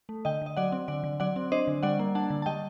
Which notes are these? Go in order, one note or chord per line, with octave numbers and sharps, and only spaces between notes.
A3
D3 D#5 G5
D3 D#5
F#3 D5 F#5
C4
D3 D5 F#5
D3
F#3 D5 F#5
C4
D4 C5 D#5
D3
G3 D5 F#5
A#3
D4 F#5 A5
D3
A5
G3 D#5 G5